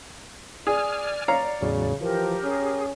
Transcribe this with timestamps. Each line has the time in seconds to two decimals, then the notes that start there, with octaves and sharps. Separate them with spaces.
0.67 G#4 D5 G#5 F6
1.28 C#5 F5 A#5
1.62 E2 A2 C#3 F#3
2.01 E3 F3 G4 A#4
2.44 C#4 G#4